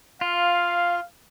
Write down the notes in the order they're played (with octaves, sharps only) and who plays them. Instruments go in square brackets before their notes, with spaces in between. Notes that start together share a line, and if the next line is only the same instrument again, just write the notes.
[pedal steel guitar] F4 [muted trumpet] F5